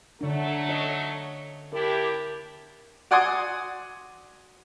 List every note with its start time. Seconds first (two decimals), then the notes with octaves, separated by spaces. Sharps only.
0.21 D3 F#3 A3 D4
0.69 C#5 D#5
1.73 D4 E4 G4 A#4
3.11 F#4 D5 F#5 G#5 C6 D#6